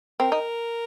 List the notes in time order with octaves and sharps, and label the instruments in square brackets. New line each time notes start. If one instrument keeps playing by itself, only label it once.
[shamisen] C4 [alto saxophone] A#4
[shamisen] D#4